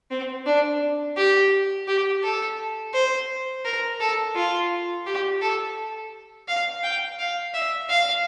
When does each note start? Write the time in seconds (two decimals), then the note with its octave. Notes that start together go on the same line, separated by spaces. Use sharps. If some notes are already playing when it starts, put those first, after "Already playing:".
0.11 C4
0.46 D4
1.17 G4
1.88 G4
2.23 A4
2.94 C5
3.65 A#4
4.00 A4
4.36 F4
5.06 G4
5.42 A4
6.48 F5
6.83 G5
7.19 F5
7.54 E5
7.89 F5